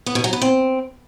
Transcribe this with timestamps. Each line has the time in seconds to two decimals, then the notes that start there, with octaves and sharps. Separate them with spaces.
0.06 B3
0.15 B2
0.24 F#3
0.33 B3
0.42 C4